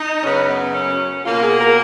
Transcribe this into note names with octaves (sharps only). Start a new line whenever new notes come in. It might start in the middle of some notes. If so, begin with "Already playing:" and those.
Already playing: D#4
F#2 C#3 F#3 B3 C#4
B3
C#4
B2 A#3 F4
G#4
A#4